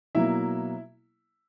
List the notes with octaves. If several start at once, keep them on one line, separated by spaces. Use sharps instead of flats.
B2 F#3 A#3 E4 E5